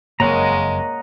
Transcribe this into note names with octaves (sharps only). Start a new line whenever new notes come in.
F#1 F2 G#3 A#3 C#5 D#5 F#5 A#5